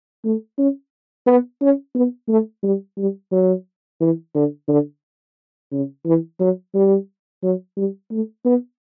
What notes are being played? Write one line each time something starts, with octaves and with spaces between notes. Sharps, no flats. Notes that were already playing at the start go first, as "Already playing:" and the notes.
A3
C#4
B3
C#4
B3
A3
G3
G3
F#3
E3
D3
D3
C#3
E3
F#3
G3
F#3
G3
A3
B3